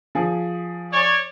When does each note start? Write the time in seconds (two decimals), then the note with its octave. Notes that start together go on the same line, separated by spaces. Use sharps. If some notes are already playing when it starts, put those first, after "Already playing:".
0.15 F3 G#4
0.92 C#5 D5